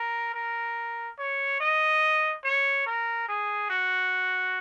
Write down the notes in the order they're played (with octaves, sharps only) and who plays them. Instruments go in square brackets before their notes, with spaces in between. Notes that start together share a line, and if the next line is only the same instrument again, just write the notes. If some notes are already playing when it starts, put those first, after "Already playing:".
Already playing: [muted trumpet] A#4
A#4
C#5
D#5
C#5
A#4
G#4
F#4